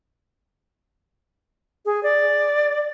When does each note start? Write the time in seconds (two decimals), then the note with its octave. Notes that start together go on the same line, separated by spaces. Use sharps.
1.86 G#4
2.03 D5